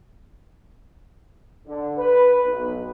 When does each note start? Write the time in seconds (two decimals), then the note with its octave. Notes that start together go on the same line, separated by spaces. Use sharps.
1.66 D3
1.97 B4
2.45 B1